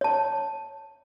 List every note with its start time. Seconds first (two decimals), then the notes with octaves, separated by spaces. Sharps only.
0.01 C#5 A5